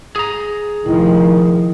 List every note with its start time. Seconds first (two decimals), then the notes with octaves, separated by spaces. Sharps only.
0.16 G#4 A#5
0.86 F1 D#3 F3 E4